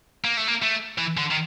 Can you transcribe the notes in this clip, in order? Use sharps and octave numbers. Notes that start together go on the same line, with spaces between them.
A#3
A3
A#3
A3
E3
D3
D#3